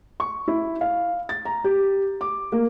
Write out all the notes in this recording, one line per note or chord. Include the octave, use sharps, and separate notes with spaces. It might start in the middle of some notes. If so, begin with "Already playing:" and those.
C#6
E4
F5
A6
A#5
G4
D6
A#3